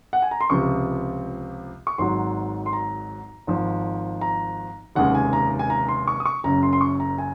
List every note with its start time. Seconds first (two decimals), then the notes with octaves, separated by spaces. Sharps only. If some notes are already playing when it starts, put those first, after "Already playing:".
0.13 F#5
0.22 G#5
0.31 A#5
0.41 C6
0.50 C#2 C3 F3 C#6
1.87 C#6
1.98 G#1 G#2 F#3 C6
2.66 C6
2.73 A#5
3.47 G#1 G#2 F3
4.21 A#5
4.96 F1 D#2 C#3 G#3 F#5
5.15 G#5
5.33 A#5
5.59 G#5
5.70 A#5
5.88 C6
6.08 C#6
6.20 D#6
6.26 C#6
6.44 F#1 F#2 C#3 A#5
6.63 C6
6.73 C6
6.81 C#6
7.00 A#5
7.18 G#5